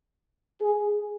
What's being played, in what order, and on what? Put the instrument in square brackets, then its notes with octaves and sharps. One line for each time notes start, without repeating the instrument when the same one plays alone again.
[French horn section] G#4